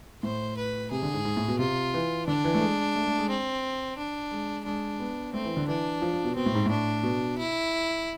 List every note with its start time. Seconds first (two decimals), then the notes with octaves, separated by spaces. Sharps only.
0.23 A2 C5
0.57 B4
0.91 C3 G#4
1.03 D3
1.14 G#2
1.25 G#2
1.37 A2
1.48 B2
1.59 C3 F4
1.94 E3
2.27 D3 D4
2.45 E3
2.54 A3
2.61 G#3
2.95 A3
3.07 A3
3.19 G#3
3.30 C4
3.98 D4
4.32 G#3
4.65 G#3 D4
4.99 B3
5.33 A3 C4
5.45 E3
5.57 D3
5.68 E3 D4
6.02 F3
6.13 F3
6.25 B2
6.36 B2 C4
6.46 A2
6.55 G#2
6.66 A2 D4
7.03 B2
7.38 E4